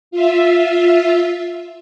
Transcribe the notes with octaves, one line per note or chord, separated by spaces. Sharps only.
F4 E5